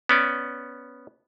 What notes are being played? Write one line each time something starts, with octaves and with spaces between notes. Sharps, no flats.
B3 C#4 D5